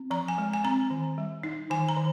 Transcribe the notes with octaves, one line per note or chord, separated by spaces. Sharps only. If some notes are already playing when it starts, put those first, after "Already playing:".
Already playing: C4
F3 A#5
G#5
G#3
G#5
C4 A#5
D#3
G3
D#4
D#3 G#5
A#5
D#3